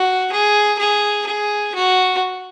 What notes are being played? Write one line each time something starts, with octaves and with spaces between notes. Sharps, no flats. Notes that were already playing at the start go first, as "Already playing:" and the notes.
Already playing: F#4
G#4
G#4
G#4
F#4